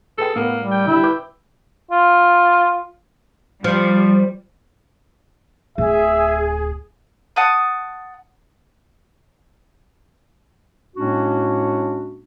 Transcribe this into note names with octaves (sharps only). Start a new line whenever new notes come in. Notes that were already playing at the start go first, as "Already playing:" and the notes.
G#4 A4 B4 G5
A2 A#3 B3 A#4
G3
G5
D3 G3 E4
B4 D6 G6
F4
F3 G3
D1 G#4 E5
F#5 A5 D#6
A2 G#3 A#3 C#4 D4 F#4